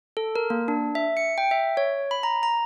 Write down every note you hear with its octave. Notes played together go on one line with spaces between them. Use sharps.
A4
A#4
A#3
D4
E5
C#7
G5
E5
C#5
B5
A#5
A#5